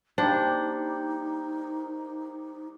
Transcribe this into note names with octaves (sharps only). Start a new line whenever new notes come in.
G3 A#3 D4 D#4 C5